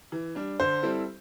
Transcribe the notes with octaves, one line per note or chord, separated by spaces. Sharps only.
E3
G3 D4
D3 C5
G3 C4 E4 A4